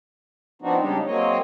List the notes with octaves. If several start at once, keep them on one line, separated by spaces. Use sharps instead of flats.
F3 B3 C4 D4 D#4 F#4
C#3 G3 G#3 D4 D#4 G4
F#3 G#3 A#3 C4 C#5 D#5